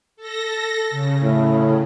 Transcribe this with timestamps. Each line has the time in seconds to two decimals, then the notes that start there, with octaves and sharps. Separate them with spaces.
0.16 A4 A#6
0.90 C#3
1.23 A2